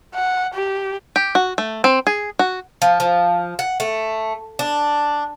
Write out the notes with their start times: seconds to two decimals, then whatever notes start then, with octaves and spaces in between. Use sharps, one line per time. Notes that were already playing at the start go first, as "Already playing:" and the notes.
0.15 F#5
0.55 G4
1.16 G4
1.35 F#4
1.58 A3
1.84 C4
2.07 G#4
2.39 F#4
2.82 F3
3.00 F3
3.59 F#5
3.80 A3
4.59 D4